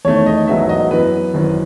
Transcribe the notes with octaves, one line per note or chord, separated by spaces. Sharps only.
E2 D#3 A3 C#5
D#5
A1 G#2 F#3 B3 E5
D#5
F#2 E3 B3 B4
G#1 F#2 E3